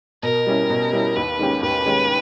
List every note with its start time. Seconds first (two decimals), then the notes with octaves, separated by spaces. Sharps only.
0.23 B2 A#4
0.47 G3 C#4 E4
0.70 B2
0.93 G3 C#4 E4
1.16 D#2 B4
1.39 D#3 G#3 C#4 G4
1.62 D#2 B4
1.85 D#3 G#3 C#4 G4